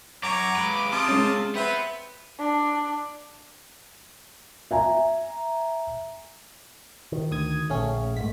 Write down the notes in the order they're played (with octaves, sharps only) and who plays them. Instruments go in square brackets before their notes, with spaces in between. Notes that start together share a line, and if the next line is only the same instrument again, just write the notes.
[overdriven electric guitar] F#2 [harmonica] C#5 A#5 C#6 [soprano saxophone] D6
[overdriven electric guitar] G#3 B4
[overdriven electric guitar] C3 [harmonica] F4 A5 D#6
[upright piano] G#3 C#4
[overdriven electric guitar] B3 [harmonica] C4 B4 G5 [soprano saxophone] E5
[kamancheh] D4
[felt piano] E5 G#5 A#5
[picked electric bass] D#3
[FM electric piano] D2 D#6 G#6
[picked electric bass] A#1 [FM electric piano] A3 C#4 G#4
[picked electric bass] G#2 A3 [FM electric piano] B6